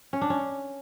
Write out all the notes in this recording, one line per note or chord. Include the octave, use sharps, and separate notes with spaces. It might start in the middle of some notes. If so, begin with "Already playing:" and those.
C#4
D4
C#4